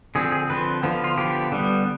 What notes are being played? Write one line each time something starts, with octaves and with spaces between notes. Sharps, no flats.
D3 F3 C4 G#4
G#4
D3 F3 C4 B4
D3 F3 B3
F4
D3 F3 B3 G4
D3 G3 B3